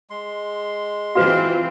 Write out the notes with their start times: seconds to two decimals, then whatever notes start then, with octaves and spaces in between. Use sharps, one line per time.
0.10 G#3 C6
1.15 E3 C4 F4 F#4 B4 C5